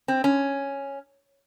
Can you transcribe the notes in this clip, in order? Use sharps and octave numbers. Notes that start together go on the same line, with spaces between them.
C4
C#4